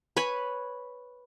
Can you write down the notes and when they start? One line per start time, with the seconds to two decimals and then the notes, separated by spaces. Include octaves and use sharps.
0.17 B4 C#5 G#5 B5